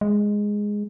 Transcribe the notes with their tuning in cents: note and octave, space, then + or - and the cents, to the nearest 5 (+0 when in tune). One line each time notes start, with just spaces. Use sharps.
G#3 -5